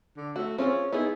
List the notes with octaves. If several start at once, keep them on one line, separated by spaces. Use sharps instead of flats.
D3
A3 F#4
C4 C#4 F4 G#4
B3 D#4 E4 G#4